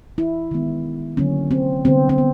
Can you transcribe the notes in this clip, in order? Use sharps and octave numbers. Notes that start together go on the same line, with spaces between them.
E4
D#3 G#3 B3
D3 F#3 A#3 C#4
C4
D3 G3 B3 C4
C4
B3